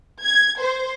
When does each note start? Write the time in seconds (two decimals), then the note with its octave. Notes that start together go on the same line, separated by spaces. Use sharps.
0.24 G#6
0.61 C5